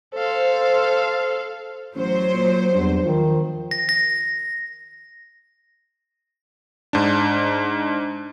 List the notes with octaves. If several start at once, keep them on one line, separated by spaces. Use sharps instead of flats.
A4 C5 F5
A1 F#3 C5
A#2
E2 G2
D#3 F3
A#6
A#6
G#2 D4